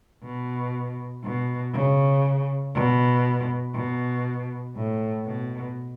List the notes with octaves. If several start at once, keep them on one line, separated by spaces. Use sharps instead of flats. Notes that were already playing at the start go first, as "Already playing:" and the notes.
B2
B2
C#3
B2
B2
A2
B2